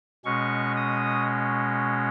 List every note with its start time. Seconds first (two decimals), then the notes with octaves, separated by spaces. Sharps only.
0.25 B2 G#3 C#4 C#6
0.77 D#6